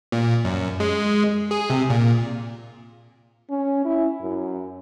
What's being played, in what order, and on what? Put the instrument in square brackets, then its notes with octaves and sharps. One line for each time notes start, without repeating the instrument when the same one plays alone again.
[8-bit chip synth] A#2
F#2
G#3
G#4
C3
A#2
[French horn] C#4
E4
F#2